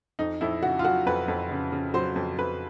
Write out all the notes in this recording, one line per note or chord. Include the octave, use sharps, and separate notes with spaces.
F2 D#4
F2 E4
C#3 F#4
F4
F#3 F#4
F2 B4
F2
C#3
C#3
F#3 C5
F2
F2 B4